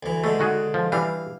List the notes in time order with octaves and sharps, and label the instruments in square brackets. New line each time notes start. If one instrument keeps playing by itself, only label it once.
[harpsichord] D2 E3
[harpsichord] D3 G#3 [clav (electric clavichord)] A3
[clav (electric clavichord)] D#3 F#4 G#4
F3
[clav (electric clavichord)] E3 G3 D4 [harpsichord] F5